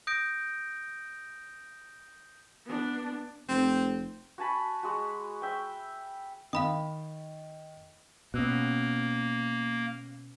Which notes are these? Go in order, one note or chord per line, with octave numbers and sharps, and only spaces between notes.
D#6 G6 A#6 D7
B3 D4
F1 C4
F#4 G#5 A5 B5
G#3 F#4
E5 G5
D#3 F5 B5 D#6
B2 A#3 C#4 E6 F#6